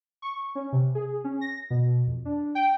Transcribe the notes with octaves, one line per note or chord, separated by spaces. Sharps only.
C#6
C#4
C3
G#4
C#4
A#6
B2
F2
D4
G5